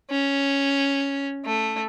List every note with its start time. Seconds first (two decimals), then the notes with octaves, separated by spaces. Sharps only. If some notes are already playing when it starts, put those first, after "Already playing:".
0.11 C#4
1.45 A3